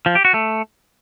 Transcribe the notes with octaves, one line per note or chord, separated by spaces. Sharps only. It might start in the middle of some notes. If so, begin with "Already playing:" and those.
F3
G4
F#4
A3